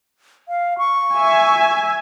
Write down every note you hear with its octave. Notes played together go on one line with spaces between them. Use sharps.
F5
C#6
E5 G#5